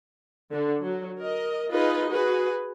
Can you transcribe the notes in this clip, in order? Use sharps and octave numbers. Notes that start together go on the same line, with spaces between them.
D3
F#3
A#4 D#5
D#4 F4 G#4 B4 D#5
F#4 G#4 B4